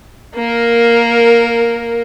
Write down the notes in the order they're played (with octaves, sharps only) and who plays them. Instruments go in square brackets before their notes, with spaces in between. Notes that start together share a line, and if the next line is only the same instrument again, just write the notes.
[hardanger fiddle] A#3 A#4